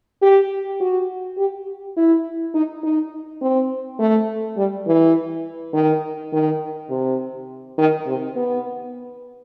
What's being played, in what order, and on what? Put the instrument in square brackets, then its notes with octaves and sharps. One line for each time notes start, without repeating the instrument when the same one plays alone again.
[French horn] G4
F#4
G4
E4
D#4
D#4
C4
A3
G3
E3
D#3
D#3
C3
D#3
C3
B3